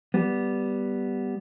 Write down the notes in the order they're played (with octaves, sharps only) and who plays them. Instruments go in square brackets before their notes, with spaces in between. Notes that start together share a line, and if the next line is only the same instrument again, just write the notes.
[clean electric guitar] G3 B3